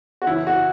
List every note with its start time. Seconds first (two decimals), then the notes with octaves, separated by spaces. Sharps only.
0.22 F#4
0.26 F#1 E2 E3 C#4 E4
0.47 F#4